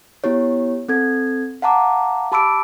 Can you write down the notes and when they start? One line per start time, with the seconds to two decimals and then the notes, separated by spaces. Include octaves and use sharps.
0.24 B3 E4 G4 C#5
0.89 C4 A4 G#6
1.62 F5 F#5 A5 A#5 D6
2.32 G4 A5 B5 D6 E6 D7